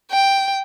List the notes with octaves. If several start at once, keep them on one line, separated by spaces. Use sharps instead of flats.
G5